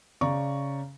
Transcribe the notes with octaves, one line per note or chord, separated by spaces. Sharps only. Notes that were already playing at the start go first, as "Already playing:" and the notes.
C#3 D5 A#5 C#6